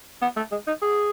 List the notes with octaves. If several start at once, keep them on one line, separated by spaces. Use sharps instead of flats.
B3
A3
G#3
D#4
G#4